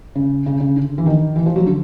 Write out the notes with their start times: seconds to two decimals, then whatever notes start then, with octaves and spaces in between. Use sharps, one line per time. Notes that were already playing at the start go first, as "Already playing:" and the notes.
0.15 C#3
0.46 C#3
0.61 C#3
0.76 D3
0.98 E3
1.06 D#3
1.36 E3
1.46 F3
1.56 F#3
1.66 D3